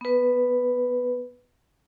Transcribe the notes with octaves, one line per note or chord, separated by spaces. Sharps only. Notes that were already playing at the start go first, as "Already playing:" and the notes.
B3 B4